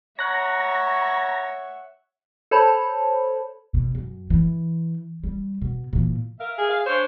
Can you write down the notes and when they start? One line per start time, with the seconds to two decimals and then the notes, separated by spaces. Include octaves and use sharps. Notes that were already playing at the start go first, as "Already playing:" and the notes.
0.19 C#5 E5 F#5 A#5 F#6 A#6
2.51 A4 C5 C#5 A5 B5
3.74 B2
3.95 F#2
4.30 E3
5.24 G3
5.62 B2
5.93 A#2 E3
6.40 A#4 E5 F5
6.58 G#4
6.70 F5
6.86 D4 C5 C#5